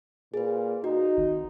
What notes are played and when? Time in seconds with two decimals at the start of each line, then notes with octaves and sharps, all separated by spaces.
0.34 A#2 G#4 B4
0.84 D#4 F#4
1.17 G#1